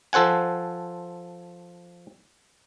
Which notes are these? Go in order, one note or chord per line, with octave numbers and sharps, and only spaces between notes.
F3 A4 C5 F#5 G#5